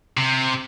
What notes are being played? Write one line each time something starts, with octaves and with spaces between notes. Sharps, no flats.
C3